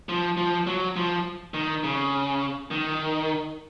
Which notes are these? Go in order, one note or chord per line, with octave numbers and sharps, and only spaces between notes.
F3
F3
F#3
F3
D#3
C#3
D#3